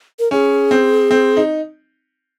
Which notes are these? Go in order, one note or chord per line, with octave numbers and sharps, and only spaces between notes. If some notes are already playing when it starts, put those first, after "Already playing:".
A#4
C#4 G#4
C4
C4
D#4